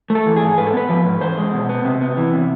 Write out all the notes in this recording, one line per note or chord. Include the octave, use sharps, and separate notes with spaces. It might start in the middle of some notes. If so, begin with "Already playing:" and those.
A3
A4
E3
G#2 G#4
G#2 B4
A4
B3 B4
F3
G#2
E2 C5
G#3
B2
B3
C3
B3
E3
C3